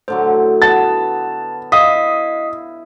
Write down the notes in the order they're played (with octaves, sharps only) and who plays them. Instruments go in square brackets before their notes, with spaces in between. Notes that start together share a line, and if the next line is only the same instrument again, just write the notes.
[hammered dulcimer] A2 D3 F#3 [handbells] C5
[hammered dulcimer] B3 [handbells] A5 [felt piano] A6
[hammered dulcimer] E4 [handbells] D#5 F5 B6 [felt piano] D#6